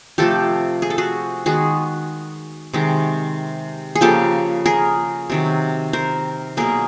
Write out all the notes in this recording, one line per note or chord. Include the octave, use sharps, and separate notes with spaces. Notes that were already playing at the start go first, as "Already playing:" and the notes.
C3 F3 A3 G4 A4
G#4
A4
F#4 G#4
D#3 G#3 B3 F#4 G#4
C3 D#3 G#3
G#4
C#3 F3 A#3 G4 A4
G#4 A#4
C3 D#3 F#3
A#4 C5
B2 F#3 A#3 G#4 A#4